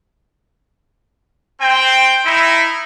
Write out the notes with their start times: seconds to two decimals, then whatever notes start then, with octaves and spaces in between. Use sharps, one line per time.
1.61 C4 G5
2.26 D#4 E4